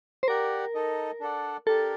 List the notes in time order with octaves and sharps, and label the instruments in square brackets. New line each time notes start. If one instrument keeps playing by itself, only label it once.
[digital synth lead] C5
[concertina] G4 D5 F#5 [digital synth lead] A#4
[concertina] D#4 A4 D#5
D4 A4 D5 F#5
[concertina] D4 G4 A#4 [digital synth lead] A4